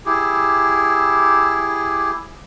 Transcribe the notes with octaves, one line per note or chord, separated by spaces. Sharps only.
E4 G4 G#4